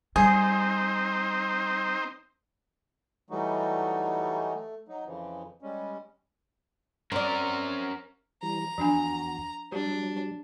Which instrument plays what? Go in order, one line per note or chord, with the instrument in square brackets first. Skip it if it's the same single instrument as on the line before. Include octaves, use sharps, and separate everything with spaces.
[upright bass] G3 [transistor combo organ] C4 D#4 C5 [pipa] G#4
[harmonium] E3 F#3 G3 A3 D#4 F#4
A3
F#3 D#4
F2 C#3 E3 F3
G3 G#3 C#4
[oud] C4 D5 [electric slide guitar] C#4 A#4
[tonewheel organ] E3 G3 [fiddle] A#5
[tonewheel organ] E2 F#4 [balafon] F3 D4 G#5
[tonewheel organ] F#3 G3 [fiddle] D4 [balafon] G4